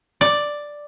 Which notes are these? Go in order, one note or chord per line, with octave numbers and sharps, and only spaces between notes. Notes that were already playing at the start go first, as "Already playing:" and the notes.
D5